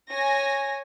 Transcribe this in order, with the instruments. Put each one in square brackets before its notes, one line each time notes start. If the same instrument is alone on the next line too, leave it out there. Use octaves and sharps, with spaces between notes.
[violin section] C#5 G#5 A#6